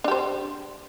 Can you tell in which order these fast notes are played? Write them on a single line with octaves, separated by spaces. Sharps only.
D4 G4 C5